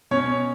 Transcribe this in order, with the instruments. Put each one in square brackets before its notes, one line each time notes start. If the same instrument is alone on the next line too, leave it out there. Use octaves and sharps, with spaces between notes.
[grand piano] B2 C#4 C#5